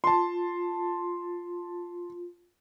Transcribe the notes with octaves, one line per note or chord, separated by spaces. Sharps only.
F4 A5 C6